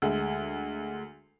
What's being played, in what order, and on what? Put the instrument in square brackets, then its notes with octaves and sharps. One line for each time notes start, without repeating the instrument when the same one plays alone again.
[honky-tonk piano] D2 G#3